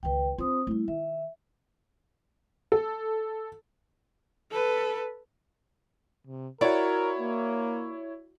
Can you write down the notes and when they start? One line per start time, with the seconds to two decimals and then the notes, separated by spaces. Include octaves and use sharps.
0.03 C#2 D#3 B4 G5
0.38 C4 D4 F4 C5 D#6
0.67 G3 A3 E4
0.88 D#3 E5
2.72 A4
4.51 A4 B4
6.27 C3
6.61 E4 F#4 A#4 C#5 D5
7.18 A#3